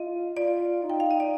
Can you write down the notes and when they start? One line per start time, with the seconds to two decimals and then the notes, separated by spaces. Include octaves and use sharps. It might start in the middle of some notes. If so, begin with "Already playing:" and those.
Already playing: F4 D#5
0.37 F4 D5
0.84 D#4
0.90 G5
1.00 F5
1.11 D#5
1.20 D5